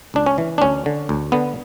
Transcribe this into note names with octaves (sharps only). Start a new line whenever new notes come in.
C#2 D4
C#4
E3
D4
D2 C#4
D3
D2
D3 B3